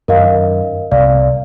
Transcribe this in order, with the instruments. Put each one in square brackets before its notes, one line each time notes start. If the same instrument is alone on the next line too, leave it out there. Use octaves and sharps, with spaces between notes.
[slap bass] F#2 D#3 [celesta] A#4 D#5 F5
[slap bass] C2 C3 C4 [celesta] D5 F5